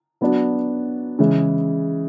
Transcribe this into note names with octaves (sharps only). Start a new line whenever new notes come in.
F#3 B3 D4
C#3 E3 G#3